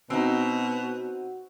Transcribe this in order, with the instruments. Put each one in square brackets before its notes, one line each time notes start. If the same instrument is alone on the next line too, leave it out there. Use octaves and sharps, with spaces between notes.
[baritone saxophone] B2 [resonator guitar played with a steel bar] C4 D#4 [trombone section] F#4